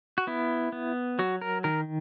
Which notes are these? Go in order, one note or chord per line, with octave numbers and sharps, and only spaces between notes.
F#4
B3 E4
B3
F#3 F#4
A#4
D#3 A#4